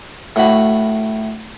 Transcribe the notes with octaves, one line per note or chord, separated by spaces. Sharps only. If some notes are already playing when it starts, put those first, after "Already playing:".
A2 F#4 B5